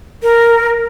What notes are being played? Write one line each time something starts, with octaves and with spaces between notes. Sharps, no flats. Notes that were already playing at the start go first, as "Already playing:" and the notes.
A#4